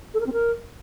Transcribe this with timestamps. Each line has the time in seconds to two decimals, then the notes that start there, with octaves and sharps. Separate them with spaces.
0.14 A4
0.20 A#4
0.27 C4
0.33 A#4